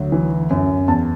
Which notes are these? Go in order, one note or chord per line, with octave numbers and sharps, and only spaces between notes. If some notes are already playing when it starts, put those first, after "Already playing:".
Already playing: D2 F#3
E3
F#2
E2 A5